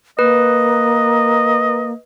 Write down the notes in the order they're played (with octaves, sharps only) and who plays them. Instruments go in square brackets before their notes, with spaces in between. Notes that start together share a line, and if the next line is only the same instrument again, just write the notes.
[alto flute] A#3 [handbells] B4 [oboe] D#5